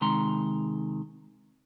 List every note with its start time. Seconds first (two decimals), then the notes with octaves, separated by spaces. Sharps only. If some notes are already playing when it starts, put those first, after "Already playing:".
0.01 C3 D#3 G#3 A#5 C6